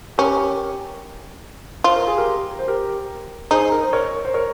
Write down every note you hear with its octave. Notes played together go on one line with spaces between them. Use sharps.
C#4 G4 A#4
F4 C5
A#4
G#4
G4 A#4
C5
G4 A#4
D#4 G#4 C5
A#4
C5
A#4 C#5
C5
A#4 C#5